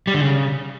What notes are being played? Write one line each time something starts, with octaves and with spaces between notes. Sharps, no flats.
G3
D3
C#3